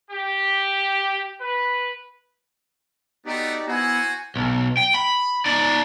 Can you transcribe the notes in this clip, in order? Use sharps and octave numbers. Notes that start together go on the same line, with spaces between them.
G4
B4
A3 B3 D#4 F#4 G4 D5
B3 E4 F#4 C5 F#5 G#5
B1
G5
B5
D#4 D5